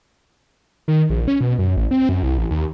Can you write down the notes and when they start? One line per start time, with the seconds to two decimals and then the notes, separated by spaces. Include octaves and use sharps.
0.88 D#3
1.10 A#1
1.28 C#4
1.41 B2
1.59 F#2
1.77 A1
1.91 C4
2.09 F#2
2.23 C2
2.38 A1
2.51 D#2